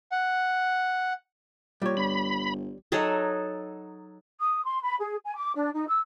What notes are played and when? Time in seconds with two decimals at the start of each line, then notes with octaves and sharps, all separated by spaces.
0.12 F#5
1.82 A#2 G3 C#5
1.97 G1 B5
2.92 F#3 D#4 G#4 A4
4.39 D#6
4.64 C6
4.82 B5
4.98 G#4
5.23 G#5
5.35 D6
5.55 D4
5.73 D#4
5.87 E6